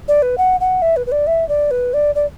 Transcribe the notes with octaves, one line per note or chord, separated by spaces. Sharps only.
D5
B4
F#5
F#5
E5
B4
B4
D5
E5
D5
B4
D5
D5